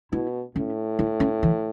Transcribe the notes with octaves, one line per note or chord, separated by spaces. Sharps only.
B2 E4
A2 C#4
E4
C#4
E3